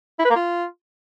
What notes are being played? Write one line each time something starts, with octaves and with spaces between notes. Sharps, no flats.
E4
B4
A#3
F4